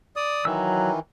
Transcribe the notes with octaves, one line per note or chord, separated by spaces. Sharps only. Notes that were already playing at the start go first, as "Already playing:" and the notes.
D5 D#6
D#3 E3 F#3 E6